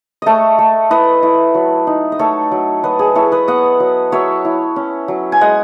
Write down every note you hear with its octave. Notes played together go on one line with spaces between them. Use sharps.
A3 A4 C#5 D#5
A3
E4 B4 D#5
E4
F#3
D#4
D#5
A3 A4 C#5
F#3
F#3 B4 D#5
G#4
E4 A4 C#5
B4 D#5
B3 D#5 F#5
F#3
F#3 C#5 E5
E4
C#4
F#3
G#5
G#3 D#5 F#5